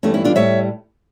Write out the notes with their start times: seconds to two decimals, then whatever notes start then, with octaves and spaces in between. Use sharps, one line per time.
0.03 G2 E3 G3 A3 C#4
0.14 C#4 E4
0.24 D4 F4
0.35 A2 G3 C#5 E5